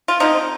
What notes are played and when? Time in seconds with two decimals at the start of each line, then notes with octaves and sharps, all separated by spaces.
0.08 F4
0.20 D3 F3 C4 D#4